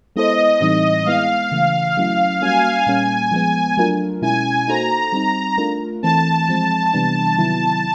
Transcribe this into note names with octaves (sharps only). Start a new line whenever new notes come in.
G#3 B3 E4 A4 C5 D#5
A2 E3 G3 C4 D#4
G#3 B3 E4 F5
C#3 E3 A3
F#3 A3 C#4 E4
G3 A#3 C#4 F#4 G#5
A#2 G3 A#3 C#4
F3 G#3 B3
F#3 A3 D4 F4 A#4
B2 G#3 C#4 E4 G#5
A#3 D#4 F#4 A4 C5 A#5
G3 C4 D#4
A3 D4 F4 A#4
E3 A3 C4 A5
F3 G#3 C4
C3 E3 G3 B3 D4
C3 D#3 F#3 B3 E4